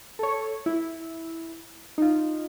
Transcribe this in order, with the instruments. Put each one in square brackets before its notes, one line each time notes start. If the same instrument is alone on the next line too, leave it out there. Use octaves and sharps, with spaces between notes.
[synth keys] A4 C#5
E4
D#4 F4